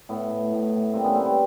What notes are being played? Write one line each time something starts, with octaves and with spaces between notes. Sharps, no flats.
A2 B3
A2
A2
A2
G3 A#3 C4
B3 C#4
G3 A#3 C4
B3